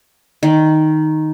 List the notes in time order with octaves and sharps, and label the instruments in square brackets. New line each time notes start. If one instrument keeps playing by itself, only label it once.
[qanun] D#3